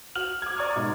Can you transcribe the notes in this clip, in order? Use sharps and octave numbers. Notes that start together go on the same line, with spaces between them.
F#4 F6 F#7
D6 G#6
D5 A#5 C#6 D#6 F6
G#2 B2